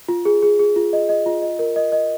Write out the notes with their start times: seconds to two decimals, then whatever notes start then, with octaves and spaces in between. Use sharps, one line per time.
0.08 F4
0.25 G#4
0.43 G#4
0.59 G#4
0.76 F4
0.93 D#5
1.09 D#5
1.26 F4
1.42 D#5
1.59 A#4
1.76 D#5
1.92 D#5